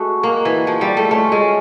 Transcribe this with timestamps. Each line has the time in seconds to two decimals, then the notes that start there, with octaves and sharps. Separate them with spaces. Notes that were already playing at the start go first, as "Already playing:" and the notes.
Already playing: G#3 A3 F#4
0.23 A#3
0.45 E3
0.67 F3
0.81 G3
0.97 A3
1.11 A3 C#4 F4 A#4
1.32 G#3